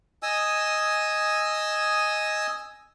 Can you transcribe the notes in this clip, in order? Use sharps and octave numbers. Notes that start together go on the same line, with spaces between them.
D#5 G#5 D#6 E6